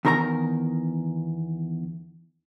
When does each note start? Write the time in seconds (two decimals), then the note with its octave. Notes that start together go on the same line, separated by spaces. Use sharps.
0.05 E2 D#3 A#4 C5 A#5